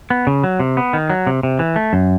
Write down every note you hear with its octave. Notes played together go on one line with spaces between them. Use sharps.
B3
C#3
F#3
C3
B3
D#3
F#3
C3
C3
E3
A3
F#2